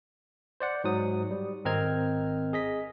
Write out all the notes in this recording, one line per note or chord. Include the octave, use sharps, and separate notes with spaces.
C5 D5 F#5
G#2 F#3 D#6
G3
G#1 C4 A#4 D#5 F6 G#6
G#4 D#5 B6